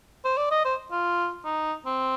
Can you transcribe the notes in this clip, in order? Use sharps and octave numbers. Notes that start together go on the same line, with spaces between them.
C5
D5
D#5
C5
F4
D#4
C4